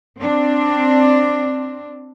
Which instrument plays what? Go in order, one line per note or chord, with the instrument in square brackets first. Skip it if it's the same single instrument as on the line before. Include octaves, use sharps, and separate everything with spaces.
[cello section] C4 D4